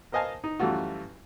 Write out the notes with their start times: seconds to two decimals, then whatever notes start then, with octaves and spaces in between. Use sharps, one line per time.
0.12 A#4 C5 D#5 F5 G#5 A5
0.44 D#4
0.59 F#2 E3 G3 A3 F4 F#4